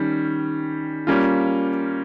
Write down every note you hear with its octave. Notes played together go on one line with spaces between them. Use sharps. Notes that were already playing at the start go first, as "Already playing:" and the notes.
Already playing: D#3 G3 C#4
G3 A#3 C#4 F4